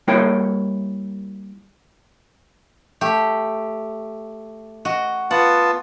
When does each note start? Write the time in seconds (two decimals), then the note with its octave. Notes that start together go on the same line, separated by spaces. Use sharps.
0.08 G3 A#3 E4 A#4 C#5 G5
3.01 A3 G4
4.85 F#4 D#5
5.31 B3 F4 F#5 A5